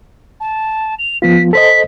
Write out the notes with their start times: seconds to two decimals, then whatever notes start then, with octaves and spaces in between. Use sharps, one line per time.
0.40 A5
0.98 F7
1.22 F3 B3 F4 B6
1.53 A4 C5 D#5 B6